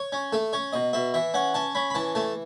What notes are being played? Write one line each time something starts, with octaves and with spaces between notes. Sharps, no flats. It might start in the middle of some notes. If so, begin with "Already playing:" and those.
Already playing: C#5
C#4
A3 A4
C#4 C#5
B2 D#5
B2 E5
E3 E5
C#4 F#5
C#4 A5
C#4 B5
B5
E3 A5
A3 A5